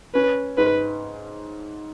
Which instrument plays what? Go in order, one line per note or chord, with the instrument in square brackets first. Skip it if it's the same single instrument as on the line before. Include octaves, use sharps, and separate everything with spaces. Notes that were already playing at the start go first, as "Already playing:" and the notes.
[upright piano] C#4 [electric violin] B4
[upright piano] G#2 [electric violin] B4